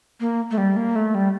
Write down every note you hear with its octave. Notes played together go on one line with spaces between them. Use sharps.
A#3
A3
G3
A#3
A3
G3